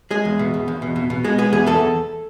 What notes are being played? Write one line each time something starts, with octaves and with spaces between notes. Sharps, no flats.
G#3 G#4
E2
B2
B2
E2
B2
B2
B2
G#3 G#4
B3 G#4
E2 G#4
E2 A4